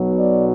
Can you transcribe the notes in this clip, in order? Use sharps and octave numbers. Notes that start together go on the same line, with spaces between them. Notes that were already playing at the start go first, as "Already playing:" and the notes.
Already playing: B1 B2 F#3
D5